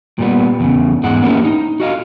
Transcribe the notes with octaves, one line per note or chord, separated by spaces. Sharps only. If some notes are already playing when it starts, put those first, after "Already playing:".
A#2 G3 B3
E2 A#2 C#3
E2 G#2 G#3 F#5
A#3 C#4 E4 G4
D#4
F#4 D#5 F5